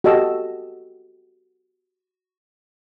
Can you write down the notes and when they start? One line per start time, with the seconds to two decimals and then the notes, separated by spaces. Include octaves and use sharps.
0.04 F#4 G4 A4 D#5 A5 E6